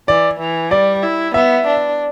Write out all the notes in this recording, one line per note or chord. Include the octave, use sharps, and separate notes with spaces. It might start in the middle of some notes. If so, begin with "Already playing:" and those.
E3 D5
E3
G3 D5
E4
B3 E5
D4